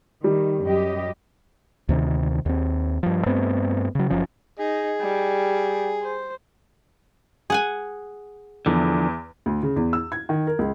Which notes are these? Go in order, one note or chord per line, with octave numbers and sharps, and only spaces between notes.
D#3 G3
F#2 G4 D#5
D2 C3 D#3
D#2 C4
G2 F3
G2 A3 B3 C4
C#3 F#3
F#1 F#2 F3 C#4
D#4 G#4
G3
C5
G#4 F#5 G#5
E2 D3 F3
D2
C#3
E2
E6
G#6
D#3
A#4
C#2